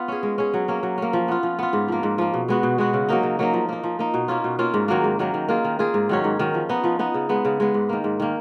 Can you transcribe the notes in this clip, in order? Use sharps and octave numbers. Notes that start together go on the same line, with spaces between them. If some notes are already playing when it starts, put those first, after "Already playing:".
Already playing: B3 F4
C#4 G#4
G#3
C#4 G#4
F#3
A#3 C#4
F#3
A#3 C#4
F3
B3 F4
F3
B3 F4
G#2
F3 A#3
G#2
F3 A#3
B2
G#3 B3 F#4
B2
G#3 B3 F#4
C#3
F#3 A#3 D#4
C#3
F#3 A#3 D#4
F3
A#3 D#4
F3
A#3 D#4
B2
A#3 C#4 F4
B2
A#3 C#4 F4
G#2
D#3 F#3 A#3
G#2
D#3 F#3 A#3
D#3
A#3 F4 G#4
D#3
A#3 F4 G#4
G#2
D#3 F#3 C#4
G#2
D#3 F#3 C#4
F3
B3 D#4
F3
B3 D#4
C#3
G#3 B3
C#3
G#3 B3
G#2
D#3 A#3
G#2
D#3 A#3